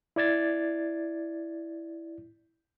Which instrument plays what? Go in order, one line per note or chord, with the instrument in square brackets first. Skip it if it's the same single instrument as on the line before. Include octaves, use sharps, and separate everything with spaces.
[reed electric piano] E4 D5 G#6 A6